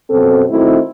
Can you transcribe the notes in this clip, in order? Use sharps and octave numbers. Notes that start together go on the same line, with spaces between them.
F#2 B2 C4 A4
D#3 A3 C4 D#4 E4 F#4